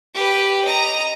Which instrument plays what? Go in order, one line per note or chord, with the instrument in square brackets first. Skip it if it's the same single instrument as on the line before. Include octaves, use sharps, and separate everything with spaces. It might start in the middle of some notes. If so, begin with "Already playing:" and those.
[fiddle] G4 B4
D#5 A#5